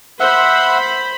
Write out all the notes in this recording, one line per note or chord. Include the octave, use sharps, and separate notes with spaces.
C5 E5 F#5 B5